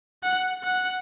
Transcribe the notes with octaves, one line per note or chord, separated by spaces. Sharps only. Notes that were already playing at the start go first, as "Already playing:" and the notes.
F#5
F#5